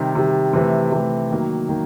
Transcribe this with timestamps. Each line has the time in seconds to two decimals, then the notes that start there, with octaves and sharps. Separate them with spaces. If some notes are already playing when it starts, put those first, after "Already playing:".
Already playing: C3 D#3 G3
0.15 C3 D#3 G3
0.53 C3 E3 A3
0.92 C3 E3 A3
1.30 D#3 F#3 A#3
1.69 D#3 F#3 A#3